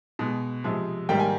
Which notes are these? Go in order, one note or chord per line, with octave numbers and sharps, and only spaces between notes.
B2 G#3
C3 F3 G#3
G#2 D#3 G3 A#3 G5
G#5